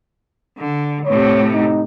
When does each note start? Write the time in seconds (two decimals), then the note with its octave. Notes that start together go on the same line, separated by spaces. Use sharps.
0.58 D3
1.06 A2 C3 C#5
1.53 D#4